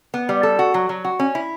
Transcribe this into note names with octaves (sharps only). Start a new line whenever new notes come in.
B3
G3
A4
F#4
F#3
F#3
F#4
C#4
E4